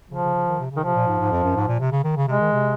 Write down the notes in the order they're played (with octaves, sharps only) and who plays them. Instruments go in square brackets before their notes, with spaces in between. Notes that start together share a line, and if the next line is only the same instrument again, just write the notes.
[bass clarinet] C#3 [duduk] F3
[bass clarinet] C#3
C#3
D#3
C3
C#3
[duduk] D#3
[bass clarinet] C3 [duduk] F3
[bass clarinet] A#2
G#2
G#2
F2
F#2
G#2
A#2
C3
C#3
D#3
C#3
[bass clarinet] C3 [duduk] G#3
[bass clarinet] D#3
C3